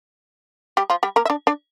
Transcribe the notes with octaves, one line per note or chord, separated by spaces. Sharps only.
G3 G4
F3 F4
G3 G4
A#3 A#4
E5
D4 D5
D4 D5